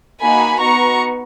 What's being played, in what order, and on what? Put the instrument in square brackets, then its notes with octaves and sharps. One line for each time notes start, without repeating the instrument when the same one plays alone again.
[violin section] A#3 D#4 F#4 G#5 B5
B3 D#4 F#4 A#5 C#6